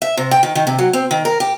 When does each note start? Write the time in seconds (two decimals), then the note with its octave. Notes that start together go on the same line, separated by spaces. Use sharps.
0.02 E5
0.17 C3
0.31 G5
0.43 D#3
0.55 D#3
0.67 C3
0.78 F#3
0.93 C4
1.11 D#3
1.25 A#4
1.40 G4